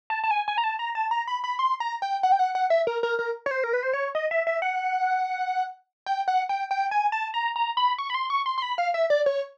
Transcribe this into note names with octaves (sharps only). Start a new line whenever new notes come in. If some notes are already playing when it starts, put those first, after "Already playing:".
A5
A5
G#5
G#5
A#5
A5
A#5
A5
A#5
B5
B5
C6
A#5
G5
F#5
G5
F#5
F#5
E5
A#4
A#4
A#4
C#5
C5
A#4
B4
C5
C#5
D#5
E5
E5
F#5
G5
F#5
G5
G5
G#5
A5
A#5
A#5
B5
C#6
B5
C6
C#6
C6
C6
B5
F5
E5
D5
C#5